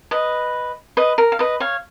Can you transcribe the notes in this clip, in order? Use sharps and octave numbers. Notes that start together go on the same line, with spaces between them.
B4 D#5
B4 D#5
A#4
F5
B4 D#5
C#5 F5